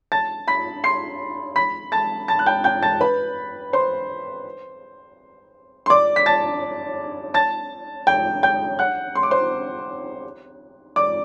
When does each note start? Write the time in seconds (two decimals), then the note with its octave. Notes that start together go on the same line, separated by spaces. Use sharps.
0.12 A5 A6
0.48 B5 B6
0.84 C6 C7
1.56 B5 B6
1.92 A5 A6
2.28 A5 A6
2.39 F#6
2.46 G5 G6
2.64 G5 G6
2.83 A5 A6
3.01 B4 B5
3.73 C5 C6
5.86 C6
5.90 D5 D6
6.16 B6
6.26 A5 A6
7.34 A5 A6
8.07 G5 G6
8.43 G5 G6
8.79 F#5 F#6
9.15 C6
9.23 D6
9.31 C5 C6
10.96 D5 D6